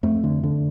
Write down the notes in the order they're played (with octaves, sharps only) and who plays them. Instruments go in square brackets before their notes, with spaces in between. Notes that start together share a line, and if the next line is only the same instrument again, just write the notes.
[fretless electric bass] F2 A3
D3
D3